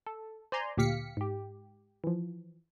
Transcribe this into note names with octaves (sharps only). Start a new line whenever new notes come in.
A4
C5 D5 G#5 A#5 C6
D2 A#2 G4 F5 B6 C#7
G#2 G4
E3 F3